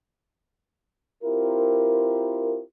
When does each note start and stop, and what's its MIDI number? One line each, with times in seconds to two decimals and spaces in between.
1.24 2.62 60
1.24 2.62 64
1.24 2.62 65
1.24 2.62 67
1.24 2.62 70